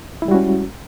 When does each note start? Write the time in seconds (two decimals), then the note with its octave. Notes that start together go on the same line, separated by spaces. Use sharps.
0.22 E4
0.25 G#3
0.28 G3
0.31 F#4
0.34 C#4